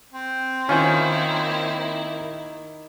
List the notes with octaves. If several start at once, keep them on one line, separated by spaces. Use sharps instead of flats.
C4
D#3 A#3 C#4 E4 F4 C5